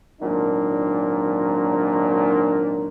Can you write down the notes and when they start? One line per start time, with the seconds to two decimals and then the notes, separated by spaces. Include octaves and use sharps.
0.20 G#1 A#2 F#3 D4 D#4